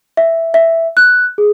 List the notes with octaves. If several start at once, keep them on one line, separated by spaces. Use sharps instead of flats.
E5
E5
F#6
G#4